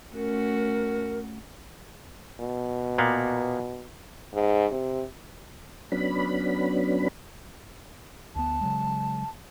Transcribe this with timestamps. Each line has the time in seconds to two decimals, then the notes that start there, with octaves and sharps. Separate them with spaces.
0.14 A3 C#4 F#4 A#4
2.40 B2
2.98 A#2 A#3 B3
4.34 G#2
4.71 C3
5.92 F#3 B3 C#4 D4 B5
8.36 D2 B3 A5
8.61 C#3 F#3 G#3